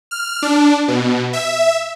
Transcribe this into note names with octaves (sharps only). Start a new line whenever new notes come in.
F6
D4
B2
E5